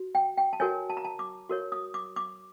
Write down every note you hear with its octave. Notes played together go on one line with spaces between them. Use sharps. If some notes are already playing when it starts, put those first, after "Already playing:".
Already playing: F#4
G5
G5
A5
F#4 A#4 C#5 G#5
A5
A#5
A5
D6
F#4 A#4 C#5
D#6
D6
D6